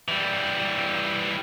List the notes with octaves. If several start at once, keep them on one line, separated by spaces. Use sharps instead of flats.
E3 G3